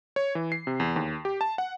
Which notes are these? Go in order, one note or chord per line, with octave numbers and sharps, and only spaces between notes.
C#5
E3
C7
C3
E2
D#2
G4
A5
F#5